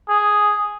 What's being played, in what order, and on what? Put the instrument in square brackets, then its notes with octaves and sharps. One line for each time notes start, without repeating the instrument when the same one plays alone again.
[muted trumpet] G#4